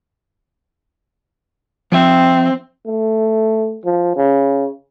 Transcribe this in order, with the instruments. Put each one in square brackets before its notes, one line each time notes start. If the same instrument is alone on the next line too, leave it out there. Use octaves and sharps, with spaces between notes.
[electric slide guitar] F3 E5 [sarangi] C4
[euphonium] A3
F3
C#3